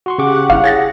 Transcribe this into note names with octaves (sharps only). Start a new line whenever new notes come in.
F#4 C6 C#6
C#3 G4 F#5 C#6 D6
G1 E4 F5
G#4 C#5 A6 A#6